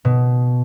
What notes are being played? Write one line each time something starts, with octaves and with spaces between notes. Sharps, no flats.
B2